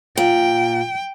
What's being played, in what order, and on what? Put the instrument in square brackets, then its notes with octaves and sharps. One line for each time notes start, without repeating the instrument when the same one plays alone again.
[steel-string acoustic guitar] A#2 [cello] G5